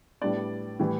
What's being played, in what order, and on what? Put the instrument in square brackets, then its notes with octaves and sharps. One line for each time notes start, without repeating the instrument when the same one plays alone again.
[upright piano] A2 G3 B3 D4 D5
A2 E3 G3